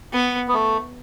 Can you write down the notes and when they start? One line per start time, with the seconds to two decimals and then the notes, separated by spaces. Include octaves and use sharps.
0.13 B3
0.48 B3
0.53 A3